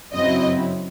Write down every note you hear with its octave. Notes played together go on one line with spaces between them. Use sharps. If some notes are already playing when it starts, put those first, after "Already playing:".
F#2 C#3 F#3 C4 E4 D#5